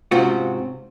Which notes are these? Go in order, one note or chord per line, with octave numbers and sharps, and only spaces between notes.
G#2 C3 C4 C#4 F4 F#4